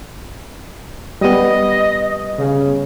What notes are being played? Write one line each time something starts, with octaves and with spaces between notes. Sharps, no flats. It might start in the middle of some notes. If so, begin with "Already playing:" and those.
G3 B3 D#5
C#3